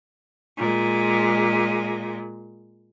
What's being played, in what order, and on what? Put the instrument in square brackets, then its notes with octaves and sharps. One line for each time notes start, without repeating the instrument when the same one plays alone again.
[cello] A#2 G#3